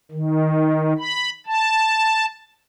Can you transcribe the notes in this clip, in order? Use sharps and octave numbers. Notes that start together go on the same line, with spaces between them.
D#3
B5
A5